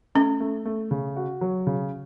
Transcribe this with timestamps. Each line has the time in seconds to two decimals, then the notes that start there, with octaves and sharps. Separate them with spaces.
0.15 A3 C#4
0.40 A3
0.65 A3
0.91 C#3
1.16 F#4
1.41 F#3
1.67 C#3